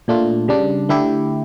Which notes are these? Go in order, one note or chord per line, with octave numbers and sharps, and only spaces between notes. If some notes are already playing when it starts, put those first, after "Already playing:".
A#2 A3 D4 F4
C#3 G3 D4
D3 A3 E4 G4